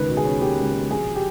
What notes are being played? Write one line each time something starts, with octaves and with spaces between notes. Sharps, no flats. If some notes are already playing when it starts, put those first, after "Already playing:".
Already playing: C#2 D#3 B4
B2
G#4
C#4
A#3 G4
C#2
B2
A#1 G#4
G4